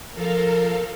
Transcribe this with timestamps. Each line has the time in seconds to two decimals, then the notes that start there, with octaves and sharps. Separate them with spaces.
0.15 F3 A4 A#4 F5